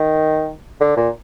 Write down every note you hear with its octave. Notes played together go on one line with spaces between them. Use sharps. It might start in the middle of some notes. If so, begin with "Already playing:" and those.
Already playing: D#3
D3
A#2